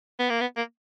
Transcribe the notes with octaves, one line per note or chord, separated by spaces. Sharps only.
B3
A#3
B3
A#3